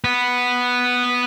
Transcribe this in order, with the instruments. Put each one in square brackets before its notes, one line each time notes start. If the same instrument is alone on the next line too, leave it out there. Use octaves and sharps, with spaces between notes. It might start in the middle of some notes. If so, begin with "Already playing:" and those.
[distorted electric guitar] B3